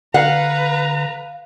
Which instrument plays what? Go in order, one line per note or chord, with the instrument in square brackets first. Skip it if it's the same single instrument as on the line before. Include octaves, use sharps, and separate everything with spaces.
[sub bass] D3 [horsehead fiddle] B4 A#5 [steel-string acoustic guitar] F5 [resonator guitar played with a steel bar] F#5